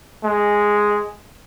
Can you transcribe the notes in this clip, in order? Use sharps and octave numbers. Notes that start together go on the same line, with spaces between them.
G#3